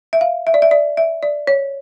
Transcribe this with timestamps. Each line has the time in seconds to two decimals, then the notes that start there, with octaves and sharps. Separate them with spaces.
0.13 E5
0.21 F5
0.47 E5
0.54 D5
0.62 E5
0.71 D5
0.97 E5
1.23 D5
1.47 C#5